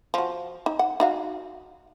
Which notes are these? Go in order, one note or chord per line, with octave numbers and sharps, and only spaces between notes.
F3 F#4
D#4
F#5
D#4 F#4 F5